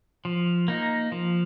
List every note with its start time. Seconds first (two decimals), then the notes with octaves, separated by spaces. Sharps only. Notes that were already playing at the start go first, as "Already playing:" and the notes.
0.25 F3
0.68 A#3 D#4
1.12 F3